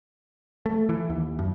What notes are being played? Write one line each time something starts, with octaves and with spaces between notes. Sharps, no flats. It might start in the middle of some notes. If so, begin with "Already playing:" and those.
A3
E3
D#2
F#2